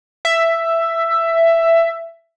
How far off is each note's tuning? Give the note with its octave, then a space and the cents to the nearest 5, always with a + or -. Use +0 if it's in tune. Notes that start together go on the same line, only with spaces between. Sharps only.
E5 +10